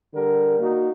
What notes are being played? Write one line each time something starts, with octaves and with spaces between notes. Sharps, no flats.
D3 G3 A#4
A#3 D#4 F#4